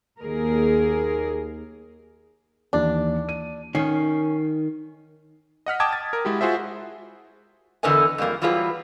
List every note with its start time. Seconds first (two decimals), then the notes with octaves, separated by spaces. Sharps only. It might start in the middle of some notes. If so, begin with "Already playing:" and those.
0.20 D#2 G#4 A#4
2.73 D#2 E3 D4
3.29 D#7
3.75 D#3 C#4 C7
5.66 D#5 F#5 F6 B6
5.80 D#5 G5 A5 D6 D#6 G#6
5.93 A6
6.13 A#4
6.25 G#3 E4 F#4 G4
6.41 F4 F#4 G#4 C5 E5
7.83 E2 D3 A#4 B4 D#5 G#5
8.18 F2 G3 G#3 A#3 F4
8.42 E3 F#3 G3 F4 G#4 B4